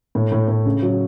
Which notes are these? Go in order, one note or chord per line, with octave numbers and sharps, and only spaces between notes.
A2
A2
A2
C#3
F#3